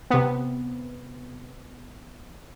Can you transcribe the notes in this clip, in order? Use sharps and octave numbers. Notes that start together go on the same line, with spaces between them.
C3 B3